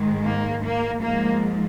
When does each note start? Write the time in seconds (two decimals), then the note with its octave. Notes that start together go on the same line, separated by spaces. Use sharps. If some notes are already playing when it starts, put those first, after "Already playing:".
Already playing: G#2 D#3 G#3
0.23 A#3
0.63 A#3
1.01 G#2 F3 G#3 A#3